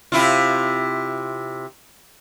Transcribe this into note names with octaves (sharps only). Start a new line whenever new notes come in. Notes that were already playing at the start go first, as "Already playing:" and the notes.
C3 E4 F4